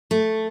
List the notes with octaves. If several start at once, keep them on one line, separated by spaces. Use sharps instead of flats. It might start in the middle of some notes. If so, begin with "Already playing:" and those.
A3